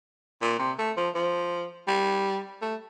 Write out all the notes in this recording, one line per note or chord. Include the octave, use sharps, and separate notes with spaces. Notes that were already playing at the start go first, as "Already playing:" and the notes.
A#2
C3
A3
F3
F3
G3
A3